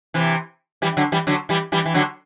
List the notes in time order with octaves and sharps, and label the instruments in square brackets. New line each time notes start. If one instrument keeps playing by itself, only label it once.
[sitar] C3 E3
E3 G3
D3 F#3
E3 G3
D3 F#3
E3 G3
E3 G3
E3
D3 F#3